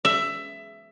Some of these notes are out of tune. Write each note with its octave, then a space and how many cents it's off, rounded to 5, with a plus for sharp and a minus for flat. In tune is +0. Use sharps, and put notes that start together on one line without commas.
E5 +15